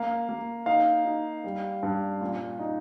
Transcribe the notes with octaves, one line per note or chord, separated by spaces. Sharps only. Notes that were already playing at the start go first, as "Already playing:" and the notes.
Already playing: A#3 F5
A#3
D#4 F5
D#4
G3
G2
A#2
D#4